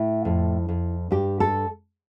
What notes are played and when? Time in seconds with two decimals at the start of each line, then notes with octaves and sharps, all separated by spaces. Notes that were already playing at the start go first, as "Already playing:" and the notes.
Already playing: A2 E4
0.25 F2
0.69 F2
1.11 G2 G4
1.40 A4